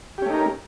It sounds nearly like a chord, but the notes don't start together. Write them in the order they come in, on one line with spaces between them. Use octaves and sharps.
G4 C#4 A3 D#4 A#4